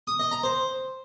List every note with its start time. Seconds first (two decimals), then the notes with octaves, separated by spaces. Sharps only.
0.07 D#6
0.19 D#5
0.31 A#5
0.43 C5